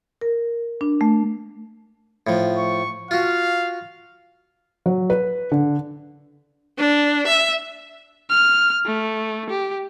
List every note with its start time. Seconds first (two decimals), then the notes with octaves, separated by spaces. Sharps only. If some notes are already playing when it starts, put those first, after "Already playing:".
0.21 A#4
0.81 D4
1.01 A3
2.27 A2 F3
2.57 C#6
3.11 F4 F#4 F5
4.86 F#3
5.10 B4
5.52 D3
6.78 D4
7.27 E5
8.30 F6
8.86 A3
9.50 G4